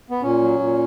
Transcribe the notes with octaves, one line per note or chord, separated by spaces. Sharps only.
B3
A#2 C#4
F#3
A#2